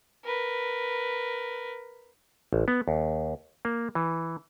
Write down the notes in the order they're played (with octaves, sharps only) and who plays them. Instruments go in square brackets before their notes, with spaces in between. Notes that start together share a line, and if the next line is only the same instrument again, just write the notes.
[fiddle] A#4 B4
[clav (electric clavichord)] A1
B3
D#2
A#3
E3